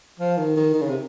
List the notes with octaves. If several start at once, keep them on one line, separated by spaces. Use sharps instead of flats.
F3
D#3
D#3
D#3
C#3
C3